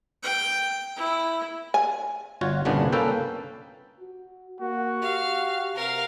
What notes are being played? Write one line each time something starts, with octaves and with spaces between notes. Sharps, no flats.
G5
E4
G#5
G1 F4 F#4 C#5
G1 C2 A#2 C#3 B3 D4
A#3 C#4 A4 B4 G5
F#4
A#3 F#4
G4 F5
C3 A#4 F5